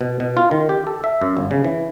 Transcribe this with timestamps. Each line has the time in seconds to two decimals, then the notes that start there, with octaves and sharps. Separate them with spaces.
0.01 B2
0.20 B2
0.37 F4
0.51 D#3
0.69 G4
0.87 A4
1.04 E5
1.21 F#2
1.37 G1
1.51 C#3
1.64 E3